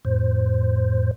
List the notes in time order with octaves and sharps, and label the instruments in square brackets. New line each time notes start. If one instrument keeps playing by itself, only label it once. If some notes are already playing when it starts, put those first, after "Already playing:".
[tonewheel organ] F2 A2 C5